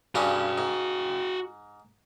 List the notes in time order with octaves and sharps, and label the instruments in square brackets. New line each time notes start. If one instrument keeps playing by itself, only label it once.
[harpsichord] G2 C#3 C#4 [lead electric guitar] F#4 G5
[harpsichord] G#2